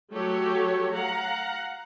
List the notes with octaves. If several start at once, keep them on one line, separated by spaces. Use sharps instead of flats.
F#3 A3 G4 A4 C#5
F5 F#5 A#5